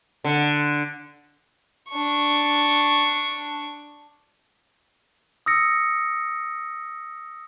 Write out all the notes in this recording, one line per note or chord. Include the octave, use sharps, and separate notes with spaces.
D3
D4 C#6
D#6 E6 A#6 C#7